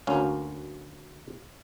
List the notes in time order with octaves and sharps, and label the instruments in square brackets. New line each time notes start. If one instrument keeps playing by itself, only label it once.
[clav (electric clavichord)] D2 F#3 A#3 C#4 F5